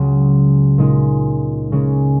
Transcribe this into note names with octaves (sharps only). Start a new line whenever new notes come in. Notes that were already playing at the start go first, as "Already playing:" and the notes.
Already playing: C#2 C#3 F#3
A#2 G#3 D#4 A#4
C#3 G#3 C#4 A#4